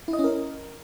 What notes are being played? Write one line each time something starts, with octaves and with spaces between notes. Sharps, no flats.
E4
D#5
C#4
A#4